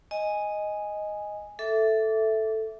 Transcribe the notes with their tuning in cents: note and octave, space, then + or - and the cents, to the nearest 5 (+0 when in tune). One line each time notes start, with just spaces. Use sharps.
D#5 +0 G#5 +0
A4 +0 E5 +0 D6 -25